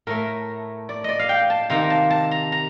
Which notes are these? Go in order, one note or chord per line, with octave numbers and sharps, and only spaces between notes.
A2 A3 A#4
D5
D5 D#5
F5
G5
A5
C3 D#3 A#3 A#5
A5
A5
A#5
A#5